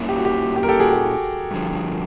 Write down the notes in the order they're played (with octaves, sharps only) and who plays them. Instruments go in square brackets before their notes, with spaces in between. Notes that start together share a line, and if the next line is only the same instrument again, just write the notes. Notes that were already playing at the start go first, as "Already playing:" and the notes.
Already playing: [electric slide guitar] A#2 G3 A#3 C#4 E4
[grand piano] G4
F#4
G4
G4
A#4
G4 A4
F#4 G#4
G4
[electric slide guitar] G2 D3 F3